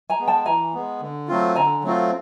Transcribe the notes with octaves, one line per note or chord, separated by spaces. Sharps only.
G#5 A#5
G#3 B3
G5 A5
E3 G#5 A#5
G#3 B3
D3
F#3 A3 C4 F4
D3 G#5 A#5
F#3 A3 C4 F4